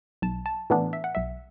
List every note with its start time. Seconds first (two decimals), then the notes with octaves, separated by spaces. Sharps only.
0.22 B1 A5
0.46 A5
0.70 A2 E3 B3 D4
0.93 E5
1.04 F#5
1.15 B1 E5